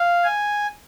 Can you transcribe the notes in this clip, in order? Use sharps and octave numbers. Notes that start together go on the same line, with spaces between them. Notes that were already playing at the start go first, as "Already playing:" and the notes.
Already playing: F5
G#5